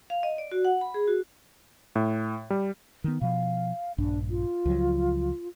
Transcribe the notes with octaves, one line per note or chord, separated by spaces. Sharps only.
F5
D#5
D5
F#4
F#5
B5
G#4
F#4
A2
G3
D#3 B3
B2 F3 F5
A#1 G2 D4
F4
C#2 F3 F#3